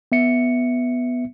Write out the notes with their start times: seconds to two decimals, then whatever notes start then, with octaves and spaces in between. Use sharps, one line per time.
0.12 B3 E5 C#7